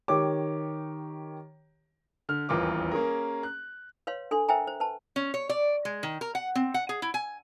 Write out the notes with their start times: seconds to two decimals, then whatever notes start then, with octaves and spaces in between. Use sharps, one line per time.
0.08 D#3 G4 C#5 D6
2.29 D3 F6
2.49 D#1 A1 E2 F4 A#4 D6
2.91 A#3 C#4 G#4 A#4
3.43 F#6
4.07 B4 C#5 F5 C6
4.31 D4 A4 G#5 C6
4.49 A#4 C5 E5 G5 G#5 A#5
4.67 C5
4.80 B4 C5 A5
5.16 C#4
5.34 C#5
5.49 D5
5.85 G#3
6.03 D#3
6.21 A#4
6.35 F#5
6.55 C4
6.74 F#5
6.89 G#4
7.02 E4
7.14 G#5